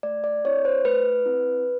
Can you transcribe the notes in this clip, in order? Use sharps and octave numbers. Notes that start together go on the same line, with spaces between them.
A3 D5
D5
C4 E4 C#5
C5
A3 B4
C4 E4